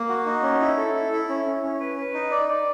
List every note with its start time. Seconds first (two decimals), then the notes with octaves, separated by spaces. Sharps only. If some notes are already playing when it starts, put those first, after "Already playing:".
Already playing: A#3
0.09 F#4
0.26 D#4
0.43 C#4
0.61 E4
0.78 A4
0.95 E4
1.12 E4
1.29 C#4
1.46 C#4
1.63 C#4
1.80 B4
1.97 B4
2.14 D#4
2.31 D5
2.49 D5